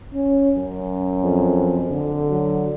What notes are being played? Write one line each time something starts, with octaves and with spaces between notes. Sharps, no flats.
C#4
F#2
F2
D3
F#3